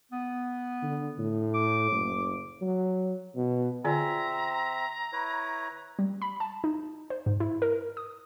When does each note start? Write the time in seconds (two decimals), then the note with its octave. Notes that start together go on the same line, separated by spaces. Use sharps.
0.12 B3
0.83 D3
1.19 A2
1.54 D6
1.92 F#1
2.62 F#3
3.35 B2
3.84 D3 C4 F4 D5 E5 A#5
5.12 E4 B4 C#5
5.99 G3
6.22 B5
6.40 A5
6.64 D#4
7.10 C5
7.26 G#2
7.40 E4
7.62 A#4
7.97 D#6